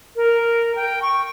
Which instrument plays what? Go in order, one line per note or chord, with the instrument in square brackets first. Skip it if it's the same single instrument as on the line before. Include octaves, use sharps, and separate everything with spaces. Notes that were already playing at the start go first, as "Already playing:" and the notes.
[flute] A#4
G5
C#6